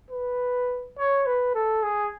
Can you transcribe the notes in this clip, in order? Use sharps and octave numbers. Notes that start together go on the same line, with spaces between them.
B4
C#5
B4
A4
G#4